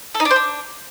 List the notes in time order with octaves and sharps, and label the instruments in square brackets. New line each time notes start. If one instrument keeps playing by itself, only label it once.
[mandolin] A4
D#4
D4
C5
D4